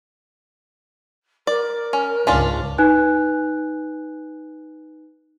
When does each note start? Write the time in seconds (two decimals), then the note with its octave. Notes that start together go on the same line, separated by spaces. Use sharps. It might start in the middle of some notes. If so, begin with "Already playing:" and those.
1.47 A#4 D5
1.93 C#4
2.27 C#2 G#2 C#4 D4 F4
2.78 D#4 B4 G#5 F#6